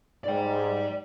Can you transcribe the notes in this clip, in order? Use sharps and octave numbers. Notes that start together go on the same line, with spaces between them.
G#2 D5 G5